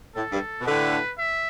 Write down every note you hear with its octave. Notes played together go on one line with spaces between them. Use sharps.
A2 A4
G2
B2
A2 D3 B4
E5